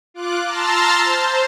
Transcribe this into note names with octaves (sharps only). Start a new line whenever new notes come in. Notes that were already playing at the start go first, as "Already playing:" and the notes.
F4 D6 F#6
A5 A#5 C6 E6 F6 A6
C5